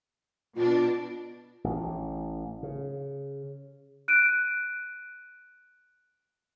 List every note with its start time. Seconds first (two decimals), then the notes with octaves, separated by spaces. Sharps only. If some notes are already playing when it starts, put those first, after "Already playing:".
0.56 B2 D4 F4
1.64 A1
2.63 C#3
4.08 F#6 D7 D#7